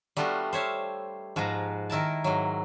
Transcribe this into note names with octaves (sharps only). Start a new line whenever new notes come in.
G3 A3 B3 D4 F4 F#4
C5 C#5 E5 F5
G#2 F3 B4 F5 A#5
D#3 E4 A#4 A5
G#2 F#3